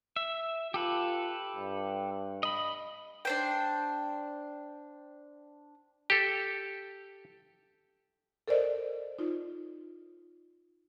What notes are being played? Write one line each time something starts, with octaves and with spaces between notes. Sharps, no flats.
E5
F4 G4 A4 B4
G2
D#5 B5
D4 C5 G5
G4 A4
A4 A#4 C5 D5 D#5
D#4 F4